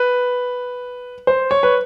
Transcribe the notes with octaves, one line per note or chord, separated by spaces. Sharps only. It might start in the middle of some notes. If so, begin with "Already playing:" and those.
Already playing: B4
C5
C#5
B4